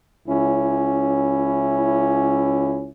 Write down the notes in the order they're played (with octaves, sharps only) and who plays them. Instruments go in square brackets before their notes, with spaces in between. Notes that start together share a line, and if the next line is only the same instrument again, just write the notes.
[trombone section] C#2 C#4 E4